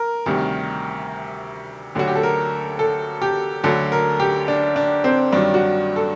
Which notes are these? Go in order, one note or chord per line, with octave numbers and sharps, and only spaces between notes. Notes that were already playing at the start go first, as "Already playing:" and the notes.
Already playing: A#4
D2 C3 D#3 G3
D2 D3 F#3 F#4
G4
A4
A#4
A4
G4
D2 D3 F#3 A4
A#4
G4
D4
D4
C4
G2 D#3 F#3 D4
F#4
A4